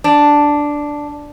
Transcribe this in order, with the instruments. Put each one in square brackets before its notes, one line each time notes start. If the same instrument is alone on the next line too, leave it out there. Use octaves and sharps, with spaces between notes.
[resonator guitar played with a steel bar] D4